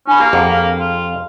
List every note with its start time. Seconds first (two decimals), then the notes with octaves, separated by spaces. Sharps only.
0.07 C#4 D4 B5
0.20 A#3 G4 A#5
0.33 F2 G4 G#4 F#5
0.49 F5
0.79 F4